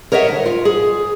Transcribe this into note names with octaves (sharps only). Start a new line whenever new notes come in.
A#4 C#5 D#5 E5 F#5
D2
F4
G#4